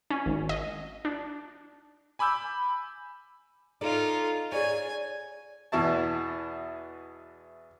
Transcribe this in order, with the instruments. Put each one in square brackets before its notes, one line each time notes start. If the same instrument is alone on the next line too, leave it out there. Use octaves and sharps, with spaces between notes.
[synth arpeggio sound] C#4
G#1
D#5
D4
[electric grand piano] G#5 B5 D6 E6 G6
[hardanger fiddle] D#4 F4 [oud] A4 D5
[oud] G#4 C#5 [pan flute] D5 [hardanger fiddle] G#5
[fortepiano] E2 B2 E4 A5